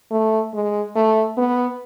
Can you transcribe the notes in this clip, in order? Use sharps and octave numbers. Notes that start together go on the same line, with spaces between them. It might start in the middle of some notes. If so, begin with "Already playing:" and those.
A3
G#3
A3
B3